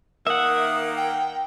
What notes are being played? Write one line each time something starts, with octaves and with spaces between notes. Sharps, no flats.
D#3 A#3 E5 F#5 D#6
G5